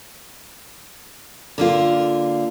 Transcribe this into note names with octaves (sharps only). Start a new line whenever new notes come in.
D3 A#3 F4